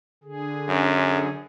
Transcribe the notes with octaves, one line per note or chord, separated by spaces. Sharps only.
D3 G#4
F#2